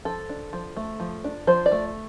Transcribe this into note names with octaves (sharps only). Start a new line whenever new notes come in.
F3 A4
D4
F3
A3
F3
D4
F3 C5
D5
A3